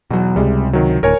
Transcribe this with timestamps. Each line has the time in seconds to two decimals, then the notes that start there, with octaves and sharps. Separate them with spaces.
0.11 E2 B2 F#3
0.36 C#2 C3 G3 G#3
0.73 D#3 F#3
1.03 D1 D2 A#4 C#5 G#5